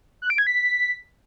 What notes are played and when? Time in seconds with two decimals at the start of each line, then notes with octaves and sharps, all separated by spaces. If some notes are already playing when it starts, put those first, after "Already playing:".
0.22 F#6
0.30 D7
0.38 G#6
0.47 B6